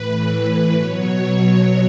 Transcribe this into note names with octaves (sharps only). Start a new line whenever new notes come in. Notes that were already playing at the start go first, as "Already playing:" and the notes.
Already playing: A2 E3 B4
B2 F#3 C#5